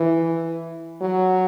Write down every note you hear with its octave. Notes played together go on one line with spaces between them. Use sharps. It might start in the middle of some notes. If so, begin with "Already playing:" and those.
Already playing: E3
F#3